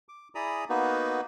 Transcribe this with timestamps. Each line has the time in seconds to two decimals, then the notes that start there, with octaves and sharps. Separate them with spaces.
0.09 D6
0.35 E4 G#4 D5 A#5 B5 D#6
0.70 A#3 B3 D#4 F#4 B4